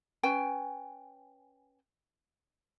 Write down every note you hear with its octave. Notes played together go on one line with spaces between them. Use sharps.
C#4 B4 G5 G#5